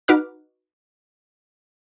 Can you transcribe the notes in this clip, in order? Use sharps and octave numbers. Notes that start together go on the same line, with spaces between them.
D#4 F#4 B4 D6 F6